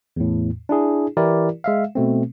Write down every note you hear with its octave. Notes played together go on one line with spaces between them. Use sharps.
E2 A2
D4 E4 G#4
E3 E4 G4 A#4 D5
G#3 E5 F5
B2 A3 C4